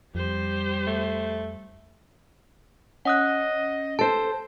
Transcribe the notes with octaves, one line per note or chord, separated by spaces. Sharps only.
F2 G3 G4 C5
A3
C#4 D#5 F#5 D#6 F#6
A4 C5 A5